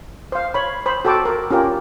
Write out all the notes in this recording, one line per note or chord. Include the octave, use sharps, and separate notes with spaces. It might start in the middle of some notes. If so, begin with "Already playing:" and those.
C5 F5
C#5 B5
C5 B5
F#4 A4 G5 A5 D6
A#4
C#4 F4 G4 A#4